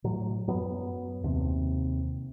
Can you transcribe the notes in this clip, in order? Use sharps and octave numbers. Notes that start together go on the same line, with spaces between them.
A2 F#3
F#2 F#3 B3
D#2 C3